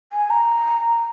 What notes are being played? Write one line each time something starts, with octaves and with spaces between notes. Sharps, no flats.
G#5
A#5